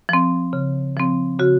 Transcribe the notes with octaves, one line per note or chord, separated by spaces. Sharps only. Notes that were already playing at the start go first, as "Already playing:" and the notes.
F3 C4
C#3
F3 C4
C#3 F#4